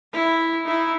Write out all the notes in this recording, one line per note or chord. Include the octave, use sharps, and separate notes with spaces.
E4
D#4 E4